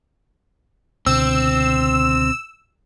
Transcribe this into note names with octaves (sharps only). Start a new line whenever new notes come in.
C#2 B2 D3 C4 E6